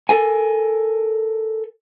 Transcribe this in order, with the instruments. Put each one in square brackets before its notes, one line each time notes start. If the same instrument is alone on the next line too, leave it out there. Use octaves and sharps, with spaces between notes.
[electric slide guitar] A4 A#4 G#5